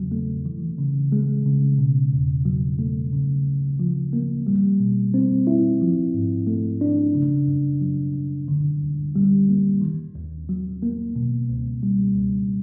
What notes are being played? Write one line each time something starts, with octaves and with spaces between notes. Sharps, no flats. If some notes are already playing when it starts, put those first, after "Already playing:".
Already playing: E2 C#3 F#3
A3
E3
C#3
G#3
C#3
B2
E2
F#3
A3
C#3
D2
F3
A#3
G3
B2
C4
E4
F3
G#2
A3
D4
C#3
F#2
F#3
F#2
D3
D2
G3
A#3
D#3
D#2
F#3
A#3
B2
C#2
G3
C#2